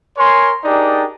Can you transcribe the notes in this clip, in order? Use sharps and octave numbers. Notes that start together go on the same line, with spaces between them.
A#4 C#5 G#5 C6
D4 D#4 G4 G#4 A#4 D5